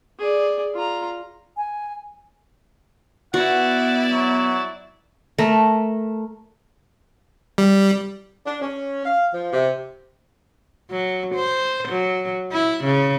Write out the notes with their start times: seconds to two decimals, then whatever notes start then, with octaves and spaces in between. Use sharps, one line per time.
0.19 G#4 D5
0.75 F4 A#5
1.57 G#5
3.34 B3 E4 F#4 D5 F#5
4.12 F#3
5.38 A3 A#4
7.58 G3
8.46 D4
8.62 C#4
9.05 F5
9.34 F3
9.53 C3
10.91 F#3
11.35 C5
11.89 F#3
12.52 E4
12.84 C#3